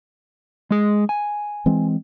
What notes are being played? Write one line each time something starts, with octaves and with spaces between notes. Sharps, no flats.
G#3 G#4
G#5
E3 G#3 C4